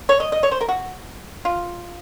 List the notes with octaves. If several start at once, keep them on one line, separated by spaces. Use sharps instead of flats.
C#5
D#5
D#5
C#5
C5
A#4
F#4
F4